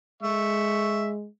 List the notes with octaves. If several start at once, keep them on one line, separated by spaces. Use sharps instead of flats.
G#3 E5 C#6